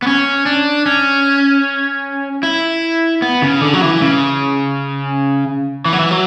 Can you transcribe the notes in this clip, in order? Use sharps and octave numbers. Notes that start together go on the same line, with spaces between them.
B3
C#4
D4
C#4
E4
B3
C#3
D3
F#3
E3
C#3
E3
F#3
E3
F#3